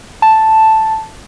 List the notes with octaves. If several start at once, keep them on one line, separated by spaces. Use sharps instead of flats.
A5